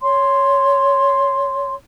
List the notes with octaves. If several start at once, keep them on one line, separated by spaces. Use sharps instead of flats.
C#5 C6